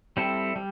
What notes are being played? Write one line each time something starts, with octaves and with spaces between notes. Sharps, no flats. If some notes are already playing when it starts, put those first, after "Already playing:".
G3 C4 E4 A4
G3